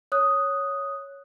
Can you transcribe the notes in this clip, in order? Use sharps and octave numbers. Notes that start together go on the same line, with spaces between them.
C#5 D#6 F#6